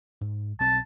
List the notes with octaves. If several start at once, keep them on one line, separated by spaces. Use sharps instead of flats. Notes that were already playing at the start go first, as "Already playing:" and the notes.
G#2
B1 C4 A5